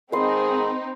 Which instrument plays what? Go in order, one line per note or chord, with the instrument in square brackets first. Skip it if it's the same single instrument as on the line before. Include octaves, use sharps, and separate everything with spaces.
[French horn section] G#2 D#3 G#4 [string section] C4 D#4 [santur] B4 C6